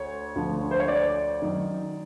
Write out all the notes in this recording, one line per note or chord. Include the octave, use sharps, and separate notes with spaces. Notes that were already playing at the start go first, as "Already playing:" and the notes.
Already playing: D2 C#5
D2 D3 F3
C5
C#5
D5
F#2 D#3